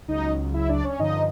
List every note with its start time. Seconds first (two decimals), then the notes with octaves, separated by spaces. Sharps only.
0.08 C#2 C#3 F#3 D#4 D#5
0.54 E4 E5
0.69 D4 D5
0.84 C#4 C#5
0.99 G2 D3 F3 D#4 D#5